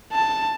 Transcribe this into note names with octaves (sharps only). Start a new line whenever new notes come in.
A5